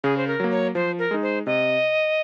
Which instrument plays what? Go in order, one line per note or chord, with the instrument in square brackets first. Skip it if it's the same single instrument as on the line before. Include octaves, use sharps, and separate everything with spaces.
[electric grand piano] C#3 [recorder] G#4
[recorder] C5
A#4
[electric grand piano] F#3 A#3
[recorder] C#5
[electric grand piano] F3 [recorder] C5
[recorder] A#4
[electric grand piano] G#3 D#4
[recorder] C5
[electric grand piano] C3 [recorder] D#5